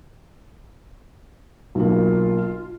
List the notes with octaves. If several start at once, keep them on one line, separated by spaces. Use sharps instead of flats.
B1 A#3 F4